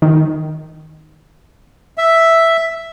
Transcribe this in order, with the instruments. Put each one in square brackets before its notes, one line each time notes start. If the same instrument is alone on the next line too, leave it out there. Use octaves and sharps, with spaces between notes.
[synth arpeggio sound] D#3
[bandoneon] E5